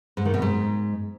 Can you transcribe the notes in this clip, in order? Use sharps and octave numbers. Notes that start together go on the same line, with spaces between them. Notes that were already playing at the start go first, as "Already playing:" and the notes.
G#2
D#3
B2
G#2